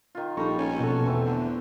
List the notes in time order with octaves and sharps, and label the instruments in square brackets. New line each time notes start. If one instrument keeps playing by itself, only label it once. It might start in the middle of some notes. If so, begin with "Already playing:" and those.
[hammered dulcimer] D#3 F4
[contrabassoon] A#1 [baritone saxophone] G3 [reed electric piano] D#4 A4 C#6 [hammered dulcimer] A#5
[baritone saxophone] C#4
[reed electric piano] B2 A4 [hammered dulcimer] F#4 A5
[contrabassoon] E2 [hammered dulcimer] E3 A3 C4
[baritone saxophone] D3